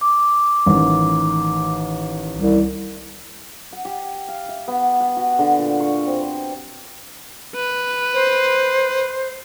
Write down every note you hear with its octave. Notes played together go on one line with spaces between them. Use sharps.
D6
A1 D#3
C2
F#5
G4
F5
E5
B3
F#5
F#4
D3
A#2
C#6
C4
C5
B4
C5